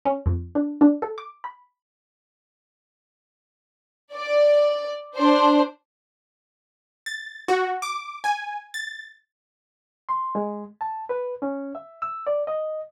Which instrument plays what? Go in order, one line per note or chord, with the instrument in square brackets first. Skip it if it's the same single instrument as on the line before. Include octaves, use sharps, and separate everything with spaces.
[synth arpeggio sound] C#4
F2
D4
D4
A4
D6
B5
[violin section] D5
D4 C5
[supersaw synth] A6
F#4
D6
G#5
A6
[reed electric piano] C6
G#3
A5
B4
C#4
E5
E6
D5
D#5